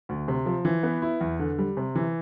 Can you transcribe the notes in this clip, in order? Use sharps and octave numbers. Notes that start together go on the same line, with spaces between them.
D2
C3
F3
E3
B3
E4
E2
D3
G3
C3
E3